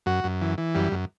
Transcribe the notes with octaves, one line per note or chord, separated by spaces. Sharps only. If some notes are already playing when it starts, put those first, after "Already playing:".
F#2 F#4
F#2
E3
E3
F#2 G3
F#2